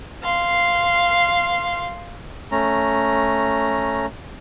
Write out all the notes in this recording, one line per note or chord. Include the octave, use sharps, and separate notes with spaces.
F5 C6
A3 C#4 A#5